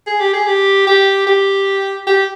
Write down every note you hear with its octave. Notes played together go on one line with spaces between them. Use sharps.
G#4
G4
G#4
G4
G4
G4
G4